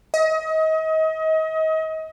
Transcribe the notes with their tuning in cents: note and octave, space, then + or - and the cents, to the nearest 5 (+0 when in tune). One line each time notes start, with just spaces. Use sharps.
D#5 +35